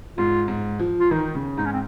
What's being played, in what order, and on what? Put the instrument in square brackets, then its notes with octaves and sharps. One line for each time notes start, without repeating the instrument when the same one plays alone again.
[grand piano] G#2 [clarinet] F4
[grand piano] G#2
F3
[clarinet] F4
[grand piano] D#3 [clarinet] D#4
[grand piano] C#3
[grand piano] G#2 [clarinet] D#4
[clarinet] C#4
C4